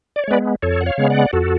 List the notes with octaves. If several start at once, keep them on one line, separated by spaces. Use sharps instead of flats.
D5
C#5
G#3 B3 B4 D5
F2 A4 C#5
F#5
C#5 F5
C#3 G#3 B3
D5 F#5
F2 F#4 A4